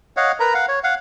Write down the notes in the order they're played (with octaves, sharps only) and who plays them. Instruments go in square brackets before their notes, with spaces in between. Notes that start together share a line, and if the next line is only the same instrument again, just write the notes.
[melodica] C#5 D#5 F5 F#5
A#4 B4 A#5
F5 F#5
C#5
F5 F#5